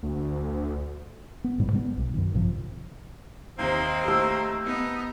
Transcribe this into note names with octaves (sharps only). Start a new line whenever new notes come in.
D2
B3
A1 G#2 G3
C3 G3 B3
B1
F#2 D#3
A#1 G2 C3 F3
D#2 C3 A#3 C4 D#4 C5
A3 G4 A5 E6
B3 D#4